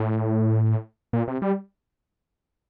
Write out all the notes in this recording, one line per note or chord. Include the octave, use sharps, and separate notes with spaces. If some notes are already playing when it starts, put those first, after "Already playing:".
Already playing: A2
A#2
C3
G3